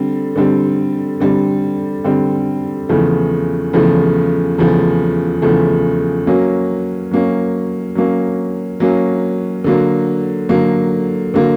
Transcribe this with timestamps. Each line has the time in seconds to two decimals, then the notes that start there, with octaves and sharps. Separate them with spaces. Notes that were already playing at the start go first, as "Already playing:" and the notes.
Already playing: D3 G3 C4
0.36 D3 G3 C4
1.20 D3 G3 C4
2.05 D3 G3 C4
2.89 E2 C#3 F3 A3
3.73 E2 C#3 F3 A3
4.58 E2 C#3 F3 A3
5.42 E2 C#3 F3 A3
6.27 F#3 A#3 C#4
7.11 F#3 A#3 C#4
7.95 F#3 A#3 C#4
8.80 F#3 A#3 C#4
9.64 D3 F#3 A#3
10.49 D3 F#3 A#3
11.34 D3 F#3 A#3